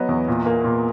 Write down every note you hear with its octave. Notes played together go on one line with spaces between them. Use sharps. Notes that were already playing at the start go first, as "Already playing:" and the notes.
Already playing: F#3 B3 D#5
E2
A#2
A#3
A#2